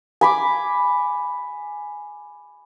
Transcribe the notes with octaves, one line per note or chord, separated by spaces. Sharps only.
G#5 B5 D6